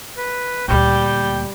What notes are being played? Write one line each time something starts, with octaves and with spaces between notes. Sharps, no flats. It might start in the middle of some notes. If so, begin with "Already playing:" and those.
B4
D2 A#2 G3 G5